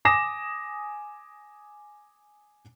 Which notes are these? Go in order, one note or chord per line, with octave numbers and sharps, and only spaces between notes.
G#5 D6 D#6 A#6 E7